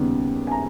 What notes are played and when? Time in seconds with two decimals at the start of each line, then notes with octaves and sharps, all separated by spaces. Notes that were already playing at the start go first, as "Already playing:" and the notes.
Already playing: D#2 C#3 G3 B3
0.47 G#5
0.52 A#5